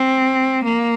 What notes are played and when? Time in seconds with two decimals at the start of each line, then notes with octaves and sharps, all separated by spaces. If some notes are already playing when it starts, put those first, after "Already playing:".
Already playing: C4
0.63 A#3